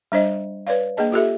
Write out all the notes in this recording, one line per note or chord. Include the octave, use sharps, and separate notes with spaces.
G3 D4 C5 D#5
B4 C#5 D5 F5
A#3 D4 G#4 D#5 A5
F4 G4 A4 E5